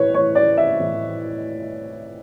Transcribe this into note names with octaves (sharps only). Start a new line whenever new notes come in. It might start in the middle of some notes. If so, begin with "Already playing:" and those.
Already playing: A2 E3 B4 C#5
A2 E3 C#5
D5
E5
A2 E3